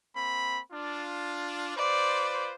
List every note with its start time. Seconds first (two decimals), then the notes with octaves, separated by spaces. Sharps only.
0.15 A#3 C4 B5
0.72 D4 F4
1.76 F4 B4 C5 D5